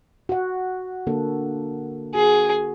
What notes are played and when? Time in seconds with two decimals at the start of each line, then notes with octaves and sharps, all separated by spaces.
0.29 F#4 F#5
1.07 D3 A#3 A4
2.15 F#4 G#4